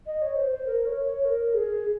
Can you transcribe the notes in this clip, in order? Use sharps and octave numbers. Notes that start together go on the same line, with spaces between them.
D#5
C#5
C5
C5
A#4
C#5
C#5
A#4
G#4